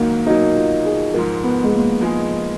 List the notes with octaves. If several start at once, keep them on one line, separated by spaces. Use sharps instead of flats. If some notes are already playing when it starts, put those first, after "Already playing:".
Already playing: G#2 D#3 F#3 A#3
B2 F#3 A#3 D#4
F4
G#4
G#2 F3 G#3 A#4
B3
G#3
A#3
F3 G#3 D#4 G#4